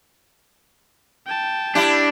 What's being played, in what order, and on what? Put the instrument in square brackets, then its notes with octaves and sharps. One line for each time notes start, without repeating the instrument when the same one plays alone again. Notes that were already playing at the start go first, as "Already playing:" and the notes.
[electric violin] G5 A5
[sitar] G3 E4 G4 [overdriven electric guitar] D4